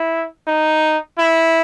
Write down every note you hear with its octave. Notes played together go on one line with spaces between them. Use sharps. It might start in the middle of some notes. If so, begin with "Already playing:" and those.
Already playing: E4
D#4
E4